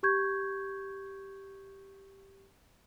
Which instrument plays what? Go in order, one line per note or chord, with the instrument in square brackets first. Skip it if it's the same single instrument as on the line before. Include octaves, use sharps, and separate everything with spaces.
[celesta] G4 C#6 G6 G#6